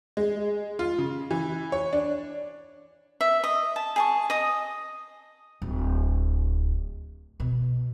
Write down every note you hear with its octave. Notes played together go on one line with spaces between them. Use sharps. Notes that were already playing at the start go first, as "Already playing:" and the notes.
G#3
F4
C#3
E3
C#5
D4
E5
D#5
A5
G#4 A5 C#6
D#5 D#6
D1
B2